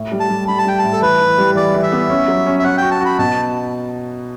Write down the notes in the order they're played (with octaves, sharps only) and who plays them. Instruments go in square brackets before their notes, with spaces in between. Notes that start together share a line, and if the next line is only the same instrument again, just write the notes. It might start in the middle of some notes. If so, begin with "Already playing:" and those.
Already playing: [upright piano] A2
G3
[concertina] A5
[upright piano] G3
[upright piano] G3 [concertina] B5
[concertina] A5
[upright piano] G3 [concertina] G5
[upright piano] A2 [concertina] A5
[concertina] A4
[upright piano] E3 [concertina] B4
[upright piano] E3
G3
[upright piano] E3 [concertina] D5
[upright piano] E3
[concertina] E5
[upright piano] B3
C#4
F#3
C#4
[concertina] E5
[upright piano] C#4 [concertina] F#5
[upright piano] F#4 [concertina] G5
[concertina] A5
[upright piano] F#4 [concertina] B5
[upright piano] B2 [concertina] A5